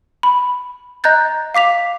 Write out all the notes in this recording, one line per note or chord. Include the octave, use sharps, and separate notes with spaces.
B5
D#5 A#5 F#6 G6 A6
F5 D6 B6 F7